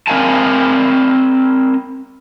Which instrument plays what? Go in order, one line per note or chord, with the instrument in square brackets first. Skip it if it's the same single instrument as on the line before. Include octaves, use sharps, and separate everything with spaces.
[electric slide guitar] C4 A#4 D#5 F5 G#5 A5